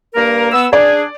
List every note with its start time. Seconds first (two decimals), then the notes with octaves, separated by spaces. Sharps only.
0.15 G2 A#3 A#4
0.52 B3 E6
0.73 D4 G#4 D5